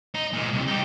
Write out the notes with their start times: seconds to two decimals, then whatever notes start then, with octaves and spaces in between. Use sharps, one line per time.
0.14 D#4
0.33 A#2 G#3
0.53 C2
0.68 D#4 G4